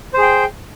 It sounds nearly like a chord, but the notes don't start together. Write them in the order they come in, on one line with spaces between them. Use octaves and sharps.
C5 G#4 G5